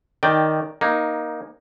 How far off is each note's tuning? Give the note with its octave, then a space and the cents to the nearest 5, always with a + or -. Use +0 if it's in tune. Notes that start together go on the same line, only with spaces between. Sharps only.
D#3 +0 D5 +0 G5 +0
A#3 +15 D#4 +0